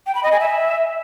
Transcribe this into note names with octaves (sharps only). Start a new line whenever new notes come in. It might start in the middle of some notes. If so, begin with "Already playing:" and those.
G5
B5
D#5
G#5
E5